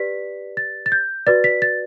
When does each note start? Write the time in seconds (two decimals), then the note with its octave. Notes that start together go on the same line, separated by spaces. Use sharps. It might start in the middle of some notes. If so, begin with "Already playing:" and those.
Already playing: G4 B4 D5 B6
0.57 A6
0.86 A6
0.92 G6
1.27 F#4 B4 D5 A6
1.44 B6
1.62 A6